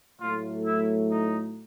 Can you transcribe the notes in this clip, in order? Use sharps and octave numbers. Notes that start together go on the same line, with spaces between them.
A2 F#3 A3 F4
E4
D#4